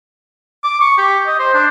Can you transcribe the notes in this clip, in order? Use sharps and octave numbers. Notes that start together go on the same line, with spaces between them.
D6
C#6
G4
D#5
C5
D4